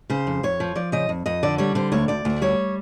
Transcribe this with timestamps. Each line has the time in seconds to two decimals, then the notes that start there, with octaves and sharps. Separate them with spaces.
0.10 C#3 C5
0.27 F2
0.43 F2 C#5
0.60 F3
0.75 F3 D5
0.92 C#3 D#5
1.09 F2
1.26 F2 D#5
1.43 D3 D5
1.58 G3 C#5
1.75 D3 C5
1.92 D2 C#5
2.08 D2 D5
2.25 D2
2.42 G3 C#5